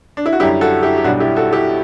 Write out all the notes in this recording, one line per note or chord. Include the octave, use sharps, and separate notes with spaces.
D4
E4
F#4
F#2 D3 G3 E4 G4
F#4 A4
E4 G4
G4
B1 B2 G3 D4 F#4
E4 G4
F#4 A4
E4 G4